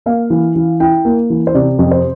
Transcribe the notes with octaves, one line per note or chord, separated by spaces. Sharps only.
A#3 F5
E3
E3
E4 G5
A#3
E3
C5
C3 D5
F2
C5